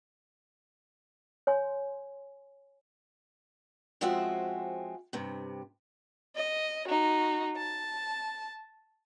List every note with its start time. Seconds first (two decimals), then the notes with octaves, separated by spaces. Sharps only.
1.47 C#5 G#5 C6
4.01 F3 G#3 C4 C#4 F#4 E5
5.13 G2 C3
6.36 D#5
6.88 D#4 F#4
7.57 A5